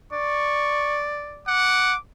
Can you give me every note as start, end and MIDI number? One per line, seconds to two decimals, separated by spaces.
0.12 1.47 74
0.12 1.05 85
1.47 1.93 78
1.47 1.99 86